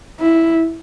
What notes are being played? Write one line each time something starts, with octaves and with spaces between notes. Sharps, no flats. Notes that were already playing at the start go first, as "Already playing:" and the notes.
E4